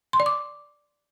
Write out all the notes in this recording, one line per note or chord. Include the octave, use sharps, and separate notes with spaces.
C6
D5
D6